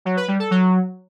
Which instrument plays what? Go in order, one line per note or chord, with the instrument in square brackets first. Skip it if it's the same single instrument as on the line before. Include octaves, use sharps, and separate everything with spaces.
[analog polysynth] F#3
B4
G3
A4
F#3